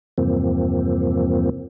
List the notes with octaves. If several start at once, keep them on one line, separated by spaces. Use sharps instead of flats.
E2 G2 C3 F3 A#3 C4